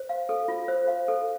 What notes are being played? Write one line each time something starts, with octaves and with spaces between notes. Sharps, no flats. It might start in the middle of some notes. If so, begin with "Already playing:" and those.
Already playing: C5
F5
A4
F4
C5
F5
A4